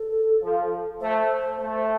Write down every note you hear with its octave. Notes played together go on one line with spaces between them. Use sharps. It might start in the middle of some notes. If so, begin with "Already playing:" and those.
Already playing: A4
F3
A3 C5
A3